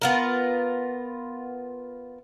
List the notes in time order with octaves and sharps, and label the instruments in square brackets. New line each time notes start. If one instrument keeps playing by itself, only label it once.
[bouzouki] B3 F4 A#4